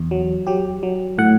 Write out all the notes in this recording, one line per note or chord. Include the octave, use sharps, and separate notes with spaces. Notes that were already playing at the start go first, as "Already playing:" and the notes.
Already playing: E2
F#3
F#3 G4
F#3
A2 F#5